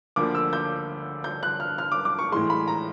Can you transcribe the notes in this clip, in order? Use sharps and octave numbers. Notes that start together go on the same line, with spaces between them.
D2 D3 F3 A#3 D6
E6
G6
G6
F#6
F6
F6
D6
D6
C#6
A2 E3 G#3 C6
B5
A#5